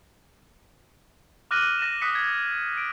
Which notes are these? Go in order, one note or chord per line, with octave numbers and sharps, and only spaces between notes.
D6 F6 F#6 A#6 D#7 F#7
A#6 D#7 E7
D#6 F#6 B6 C#7
G#6
D7